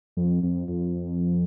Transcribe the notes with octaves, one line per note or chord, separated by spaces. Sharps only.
F2
F2
F2